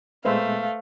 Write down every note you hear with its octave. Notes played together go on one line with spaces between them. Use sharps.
A#2 G#3 A3 B3 B4 C5 E5 F5